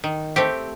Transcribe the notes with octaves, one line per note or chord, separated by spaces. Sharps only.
D#3
A3 C4 G4